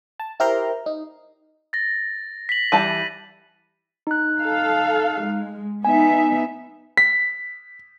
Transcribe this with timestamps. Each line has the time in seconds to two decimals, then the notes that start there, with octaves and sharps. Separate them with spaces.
0.20 A5
0.40 E4 G4 A#4 C5 A#5 C6
0.86 D#4
1.73 A6 A#6
2.49 B6 F#7
2.72 E3 G3 A5 D#7
4.07 D#4 F#6
4.39 A4 F5
5.22 G#3
5.85 B3 D#4 E5 G#5
6.97 B6